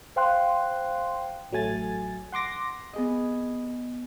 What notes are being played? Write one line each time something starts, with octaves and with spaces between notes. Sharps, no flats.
C5 F5 G5 C6 F#6
A1 F#3 A3 G#5 A6
F#5 C6 D6 A#6
B3 G#4 D#5